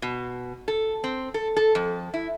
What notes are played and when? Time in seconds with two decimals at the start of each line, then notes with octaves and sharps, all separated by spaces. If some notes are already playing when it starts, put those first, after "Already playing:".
0.02 B2
0.68 A4
1.04 C4
1.34 A4
1.56 A4
1.75 F2
2.14 E4